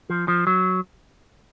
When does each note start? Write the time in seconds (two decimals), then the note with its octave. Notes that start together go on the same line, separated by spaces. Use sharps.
0.10 F3
0.28 F3
0.47 F#3